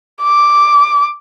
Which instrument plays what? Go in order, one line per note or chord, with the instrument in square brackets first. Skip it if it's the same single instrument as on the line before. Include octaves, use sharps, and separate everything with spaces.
[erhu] D6